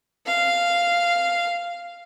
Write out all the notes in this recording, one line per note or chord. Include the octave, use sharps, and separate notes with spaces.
F5